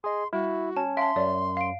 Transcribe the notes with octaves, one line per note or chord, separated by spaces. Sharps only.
G#4 D#5 C6
G3 E4 F#4
C#4 A5
E5 F5 A5 C6
F#2 C#5 D5
F5 D7